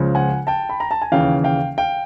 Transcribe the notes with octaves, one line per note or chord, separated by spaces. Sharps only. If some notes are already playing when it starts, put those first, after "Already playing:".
Already playing: C#2 C#3 F3
F#5 G#5
G5 A5
B5
A#5
A5
G#5
D#2 C#3 E3 F5 G5
F5 G5
F5 G5